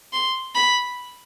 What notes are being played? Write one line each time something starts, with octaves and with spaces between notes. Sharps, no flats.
C6
B5